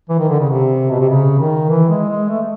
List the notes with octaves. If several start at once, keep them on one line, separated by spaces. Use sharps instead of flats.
E3
D#3
D3
C#3
C3
B2
C3
C#3
D#3
E3
G#3
G#3
A3